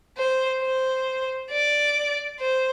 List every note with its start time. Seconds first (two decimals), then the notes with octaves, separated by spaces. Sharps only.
0.18 C5
0.62 C5
1.51 D5
2.40 C5